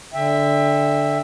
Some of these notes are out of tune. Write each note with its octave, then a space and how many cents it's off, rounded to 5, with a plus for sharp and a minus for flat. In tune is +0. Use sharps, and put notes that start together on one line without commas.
D3 -10 E5 +0 G5 +30